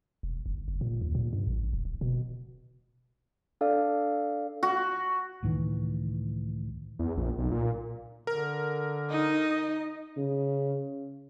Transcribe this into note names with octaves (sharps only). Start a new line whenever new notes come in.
E1
G1
F#1
A#2
D#2
A#2
G2
A1
E1
D#1
B2
D4 A4 D5 F5
F#4
C#2 A2 D#3 E3
E2
A#1
B1
A#2
D3 A#4
D#4 D#5
C#3